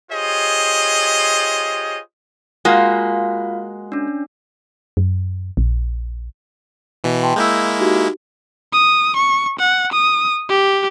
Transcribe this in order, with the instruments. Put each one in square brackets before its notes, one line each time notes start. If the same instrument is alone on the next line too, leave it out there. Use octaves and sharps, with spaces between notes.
[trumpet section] F4 G4 G#4 C5 C#5 D#5
[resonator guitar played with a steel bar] G#3 A#3 F#4 [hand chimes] F4 F5
[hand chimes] C#4 D4
[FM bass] F#2
A#1
[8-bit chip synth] B2 E3
[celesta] G5 A5 C6
[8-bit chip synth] G#3 A#3 E4 [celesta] E6 G6
[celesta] D#4 F#4 G4
[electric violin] D#6
C#6
F#5
D#6
G4